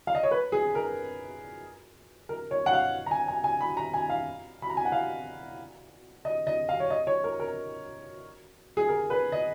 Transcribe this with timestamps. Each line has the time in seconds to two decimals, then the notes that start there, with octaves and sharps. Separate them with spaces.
0.07 F5
0.15 D#5
0.23 C#5
0.31 B4
0.52 G#4
0.75 A#4
2.29 A#4
2.51 C#5
2.66 F#5
2.73 F5
3.06 A#5
3.11 G#5
3.28 G#5
3.44 G#5
3.61 B5
3.77 A#5
3.94 G#5
4.10 F5
4.62 B5
4.70 A#5
4.77 G#5
4.85 F#5
4.92 F5
6.25 D#5
6.47 D#5
6.69 F5
6.80 C#5
6.90 D#5
7.07 C#5
7.24 A#4
7.40 A#4
8.77 G#4
8.89 A#4
9.10 B4
9.32 D#5